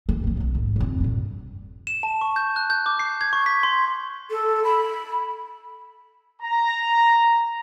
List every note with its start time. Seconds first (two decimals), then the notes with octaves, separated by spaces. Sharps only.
0.09 A#3 C4
0.24 A1 F3
0.37 B1 D#3
0.55 G#2
0.76 F2 F4
1.00 G2 A#2
1.87 E7
2.03 A5
2.21 C#6
2.36 G6
2.56 F#6
2.70 G6
2.86 D6
2.99 C7
3.21 G#6
3.33 C#6
3.46 B6
3.63 C6
4.31 A4
4.64 B5
6.42 A#5